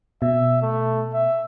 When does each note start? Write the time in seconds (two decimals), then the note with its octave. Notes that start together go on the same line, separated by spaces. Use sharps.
0.22 B2 E5
0.62 A3
1.14 E5